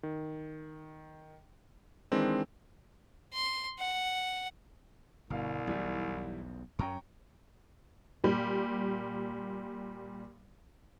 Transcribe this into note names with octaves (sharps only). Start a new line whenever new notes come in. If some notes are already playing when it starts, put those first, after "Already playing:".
D#3
D#3 E3 G#3 C4 D4
C6
F#5
G1 C2 B2 F5
B1 E2 E3 G3 E4
F#2 F#3 C#4 G5 A#5 C#6
A#2 G3